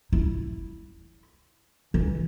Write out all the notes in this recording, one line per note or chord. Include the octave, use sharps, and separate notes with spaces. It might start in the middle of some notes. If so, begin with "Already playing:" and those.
E4
E3